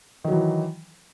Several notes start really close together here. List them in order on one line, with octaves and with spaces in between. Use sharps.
D#3 F#3 E3